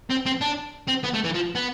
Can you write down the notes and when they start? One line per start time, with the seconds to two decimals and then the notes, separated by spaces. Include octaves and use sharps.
0.10 C4
0.26 C4
0.41 D4
0.88 C4
1.04 B3
1.14 A3
1.25 E3
1.35 F3
1.55 B3